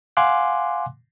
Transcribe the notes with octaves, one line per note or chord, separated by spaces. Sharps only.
F5 F#5 G#5 C6 D6 F#6